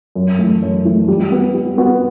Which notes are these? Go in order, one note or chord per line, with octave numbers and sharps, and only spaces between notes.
F#2
E3 A3
F#2
E3 A3
G3
B3 F#4
G3
B3 F#4